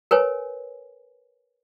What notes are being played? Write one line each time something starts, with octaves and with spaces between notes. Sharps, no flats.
A#4 B4 C#5 G#5